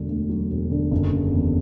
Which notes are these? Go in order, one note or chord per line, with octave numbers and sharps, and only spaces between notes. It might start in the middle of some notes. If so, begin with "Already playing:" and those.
Already playing: E1 D3
D2
F#3
E1
D3
F#1
C#3
E2